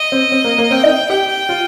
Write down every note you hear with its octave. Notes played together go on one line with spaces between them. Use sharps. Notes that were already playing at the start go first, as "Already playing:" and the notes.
Already playing: D#5
C4
C4
A#3
A#3
C4 G5
D#4
G4 G5
F4